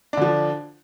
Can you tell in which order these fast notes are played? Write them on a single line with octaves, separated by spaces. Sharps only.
D4 D3 F3